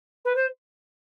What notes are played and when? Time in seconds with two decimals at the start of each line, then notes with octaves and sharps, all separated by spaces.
0.24 B4
0.35 C5